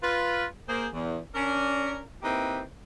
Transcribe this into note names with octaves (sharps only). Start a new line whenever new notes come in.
F4 B4
A#3 G#4 C5
E2
C#4 D4 A#4
A#3 C4 D#4 E4 G4 B4